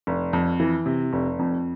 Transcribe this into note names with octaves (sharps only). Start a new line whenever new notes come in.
F1
F2
E3
C3
F1
F2